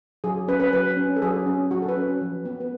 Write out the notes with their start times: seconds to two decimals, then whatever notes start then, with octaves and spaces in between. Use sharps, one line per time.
0.24 F#3 G#4
0.48 C#4 B4
0.60 B4
0.73 F#3 B4
0.97 C#4
1.16 A4
1.22 F#3 G#4
1.46 C#4
1.71 F#3 F#4
1.82 A4
1.88 B4
1.97 C#4
2.21 F3
2.45 B3
2.60 B4